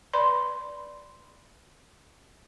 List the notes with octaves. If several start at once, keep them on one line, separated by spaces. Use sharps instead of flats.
B4 D5 B5 C6